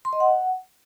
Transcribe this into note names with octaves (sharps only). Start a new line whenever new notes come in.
C6
D#5
F#5